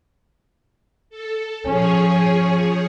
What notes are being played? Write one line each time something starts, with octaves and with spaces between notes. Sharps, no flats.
A4
F3 C#4 G#4 C#5